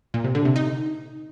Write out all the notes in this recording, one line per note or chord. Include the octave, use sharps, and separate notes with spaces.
A#2
C3
D3
C3
D#4